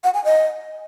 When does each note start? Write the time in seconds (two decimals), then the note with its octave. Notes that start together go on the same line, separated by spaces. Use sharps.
0.04 F#5
0.14 G#5
0.24 D#5